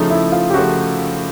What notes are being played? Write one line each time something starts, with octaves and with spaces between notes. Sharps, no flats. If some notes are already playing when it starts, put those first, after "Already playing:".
Already playing: C#3 F3 A3 D#4
E4
F4
G4
C#3 F3 A3 F#4